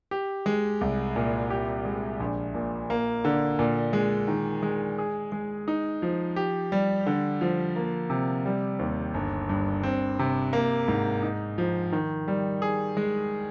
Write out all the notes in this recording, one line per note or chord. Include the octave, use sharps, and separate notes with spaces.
G4
G#3
C2
A#2
G4
G#3
A#1
A#2
A#3
D3
A#2
G#3
D#3
G#3
G#4
G#3
D#4
F3
G4
G3
D3
F3
A#3
C3
G3
D#2
G1
G2
C4
C3
A#3
G#2
D#4
F3
D#3
G3
G#4
G#3